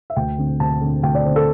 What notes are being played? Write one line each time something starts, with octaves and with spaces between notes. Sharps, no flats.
E5
D2 G5
D3 C4
D2 A5
D3 C4
D2 G5
D5
D3 C4 C5
A4